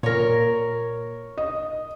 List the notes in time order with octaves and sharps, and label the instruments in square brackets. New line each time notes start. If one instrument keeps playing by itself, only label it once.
[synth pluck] A#2 [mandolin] A#4 C#5
[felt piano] D#5